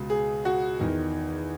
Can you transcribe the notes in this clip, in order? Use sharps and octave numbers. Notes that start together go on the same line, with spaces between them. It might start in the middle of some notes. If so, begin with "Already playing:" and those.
Already playing: C#2 B2
G#4
F#4
E2 D#3